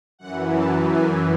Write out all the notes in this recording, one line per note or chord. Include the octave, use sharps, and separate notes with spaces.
F#2 E3 F#5
A5
G#5